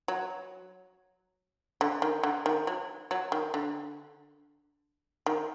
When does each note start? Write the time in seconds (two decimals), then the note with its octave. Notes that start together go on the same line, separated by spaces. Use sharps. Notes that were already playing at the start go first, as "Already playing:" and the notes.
0.08 F#3
1.81 D3
2.02 D#3
2.24 D3
2.46 D#3
2.67 F#3
3.11 F#3
3.32 D#3
3.54 D3
5.26 D#3